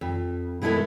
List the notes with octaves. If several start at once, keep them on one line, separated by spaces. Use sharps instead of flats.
F2
B2 G#3 E4 A4 A#4